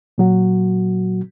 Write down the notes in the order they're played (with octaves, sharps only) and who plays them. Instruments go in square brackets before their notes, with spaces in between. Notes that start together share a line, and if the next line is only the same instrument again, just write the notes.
[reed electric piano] A#2 F#3 F#4